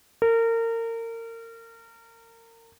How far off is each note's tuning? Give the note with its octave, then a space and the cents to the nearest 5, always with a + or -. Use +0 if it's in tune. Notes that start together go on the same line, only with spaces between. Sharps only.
A#4 -30